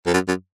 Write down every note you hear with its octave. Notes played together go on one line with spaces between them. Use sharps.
F2
F#2
F#2